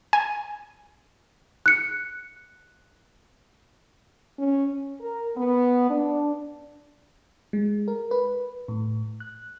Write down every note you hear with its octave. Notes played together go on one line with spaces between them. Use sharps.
G#5
F#6 C#7
C#4
A#4
B3
D4
G#3
A#4
B4
A2
F#6